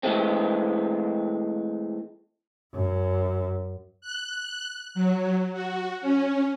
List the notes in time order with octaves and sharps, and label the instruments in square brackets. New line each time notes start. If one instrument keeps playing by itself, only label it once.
[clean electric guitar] E3 G#3 A3 C4
[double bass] F#2
[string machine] F#6
F#3
F#4
C#4